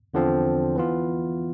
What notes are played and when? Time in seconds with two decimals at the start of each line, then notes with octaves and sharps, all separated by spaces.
0.14 E2 D3 F3 C4
0.76 E3 B3 F4